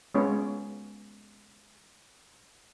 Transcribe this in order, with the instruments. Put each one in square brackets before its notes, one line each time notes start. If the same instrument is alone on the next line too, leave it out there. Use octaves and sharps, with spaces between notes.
[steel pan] G#3 B3 C#4 F4 C#5